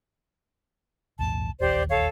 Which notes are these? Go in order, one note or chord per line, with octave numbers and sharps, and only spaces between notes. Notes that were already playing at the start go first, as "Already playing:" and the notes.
B1 E2 A2 A5
E1 A#1 D#2 G4 C5 D5
A4 C#5 F5